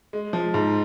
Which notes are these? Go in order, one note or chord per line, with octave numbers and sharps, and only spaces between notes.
G#3
F3
G#2